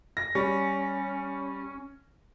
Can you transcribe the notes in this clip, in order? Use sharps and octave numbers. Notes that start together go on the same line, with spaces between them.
A#6
G3 C#4